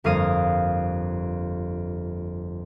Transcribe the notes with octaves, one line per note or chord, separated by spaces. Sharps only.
G1 F2 A#3 F5 D#6 D#7